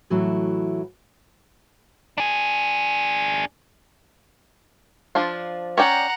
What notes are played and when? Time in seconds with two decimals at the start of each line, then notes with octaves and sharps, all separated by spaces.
0.10 A2 E3 F#3 A3 E4 F#4
2.18 D4 G#4
5.15 F3 D4 F4
5.78 C#4 D5 F#5 G5 A#5